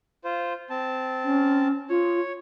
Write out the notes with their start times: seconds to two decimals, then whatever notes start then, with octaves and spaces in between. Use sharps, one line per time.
0.24 F4 C5
0.70 C4 A5
1.24 C#4
1.89 F4 C#5